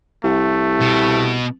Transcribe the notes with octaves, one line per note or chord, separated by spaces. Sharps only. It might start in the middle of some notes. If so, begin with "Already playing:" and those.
C2 A3
B2